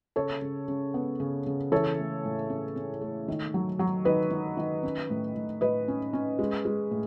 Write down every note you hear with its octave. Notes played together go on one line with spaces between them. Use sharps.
C#3 A4 C#5
C#3
C#3
B3
C#3
C#3
E3 A4 C#5
A3
A2
C#4
C#4
A3
D#3
F#3
F#3
D#3 B4 D#5
D#3
D#3
C#4
A2
A2
A2 B4 D#5
C#4
C#4
G#3
G#3
A2